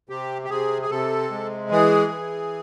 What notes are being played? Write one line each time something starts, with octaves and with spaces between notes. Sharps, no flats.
C3 G4
G4
C3 G#4
G#4
C3 A4
G#3
E3 G#4
E3